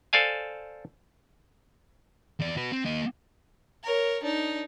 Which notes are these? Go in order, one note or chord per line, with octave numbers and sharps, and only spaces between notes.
A4 C5 D5 F5 G#5
E2 D5
F#4 B4
C4
A#3 D#5
A#4 C#5
D4 D#4